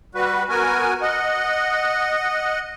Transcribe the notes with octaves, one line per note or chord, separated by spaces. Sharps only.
G3 F#4 B4
B3 F#4 A#4 G#5
D#5 F#5